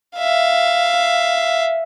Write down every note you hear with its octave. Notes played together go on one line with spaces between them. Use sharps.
E5 F5